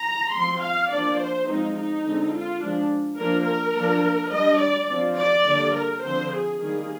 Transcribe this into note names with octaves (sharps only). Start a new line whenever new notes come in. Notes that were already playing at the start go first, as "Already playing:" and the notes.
Already playing: A#5
F3 C4 C6
F5
F3 A#3 D4 D5
C5
F3 G#3 C4 D#4
D#4
D3 G#3 C4
F4
F3 G#3 D4
F3 A#3 D4 A#4
A#4
F3 A#3 D4
G3 D4 D#5
D5
F3 C4
D5
D3 G3 A#3
A#4
D3 F3 C4 C5
G#4
D#3 G3 A#3 G#4